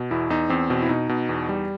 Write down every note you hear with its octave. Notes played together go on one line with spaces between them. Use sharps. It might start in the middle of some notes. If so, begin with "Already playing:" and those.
Already playing: B2
E2 E4
E2 D#4
E2 C4
B2 C4
E4
B2 D#4
B2
E2
G3